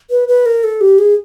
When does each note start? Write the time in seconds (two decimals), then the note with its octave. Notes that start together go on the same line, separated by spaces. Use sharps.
0.10 B4
0.28 B4
0.46 A#4
0.64 A4
0.81 G4
0.99 G#4